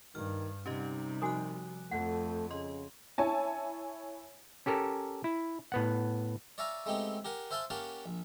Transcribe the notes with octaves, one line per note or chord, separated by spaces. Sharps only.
G2 D#3 F6
C3 G3 C#4 D#4 G4 D#5
F3 F#4 G#5 D#6 F#6
F2 A3 F#5
C#3 D#5 C6
E4 C#5 G#5 A5
C#4 G4 A4 A#4
E4
A2 B3 F#5
C#5 D5 E5 F5 G#5 A#5
G#3 A3 B3 C4 D#4 G4
G4 A#4 F#5 G#5
C5 E5 F5 G#5 A5 C6
A#3 C#4 G4 F5 F#5 A5
A#1